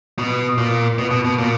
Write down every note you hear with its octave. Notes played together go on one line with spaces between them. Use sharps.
B2
A#2
B2
B2
B2
A#2